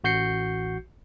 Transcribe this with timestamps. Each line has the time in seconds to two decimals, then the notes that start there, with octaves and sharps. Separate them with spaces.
0.04 A1 F#4 G6 C7 C#7